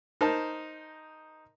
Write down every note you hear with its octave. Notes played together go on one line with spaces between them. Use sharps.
D#4 A#4 C5 A5